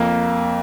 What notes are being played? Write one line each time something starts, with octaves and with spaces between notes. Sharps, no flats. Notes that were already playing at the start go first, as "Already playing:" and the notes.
Already playing: F2 A#3